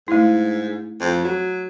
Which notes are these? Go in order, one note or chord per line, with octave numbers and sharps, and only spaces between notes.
G#2 A3 E4
F2
F#3